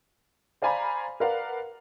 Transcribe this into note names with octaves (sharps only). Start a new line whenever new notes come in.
C5 D5 F5 G#5 A#5 B5
A#4 B4 D5 F5 F#5